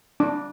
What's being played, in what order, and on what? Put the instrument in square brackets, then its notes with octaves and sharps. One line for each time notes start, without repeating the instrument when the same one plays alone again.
[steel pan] D4